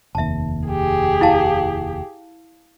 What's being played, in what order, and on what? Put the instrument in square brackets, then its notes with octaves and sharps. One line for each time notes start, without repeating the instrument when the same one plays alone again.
[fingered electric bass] F1 D#2 [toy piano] E5 A5
[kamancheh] G4 G#4
[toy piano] E4 F5 A5